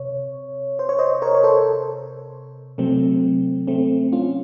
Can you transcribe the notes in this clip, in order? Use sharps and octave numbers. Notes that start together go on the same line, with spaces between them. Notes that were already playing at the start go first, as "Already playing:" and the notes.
Already playing: C3 C#5
C5
C#5
C5 D#5
A#4 C#5
C#5
A4 C5
C3 F#3 A3 C4
A3 C4
C#4 F4